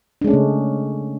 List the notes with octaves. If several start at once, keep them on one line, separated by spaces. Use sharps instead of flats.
C#3 G#3 A3 C#4 D4